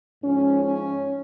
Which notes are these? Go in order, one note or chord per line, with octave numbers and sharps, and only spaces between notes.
G#2 F3 C#4
C#4